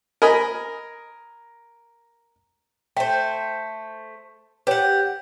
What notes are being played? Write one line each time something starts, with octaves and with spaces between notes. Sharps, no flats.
A#4 D#5 G#5 B5
A3 C5 G5
G4 B4 C#5 F#5